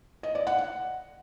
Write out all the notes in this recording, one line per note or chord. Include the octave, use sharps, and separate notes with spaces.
D#5
D5
F#5
F#5